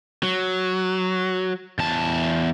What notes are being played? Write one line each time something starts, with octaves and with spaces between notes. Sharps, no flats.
F#3
E2 A5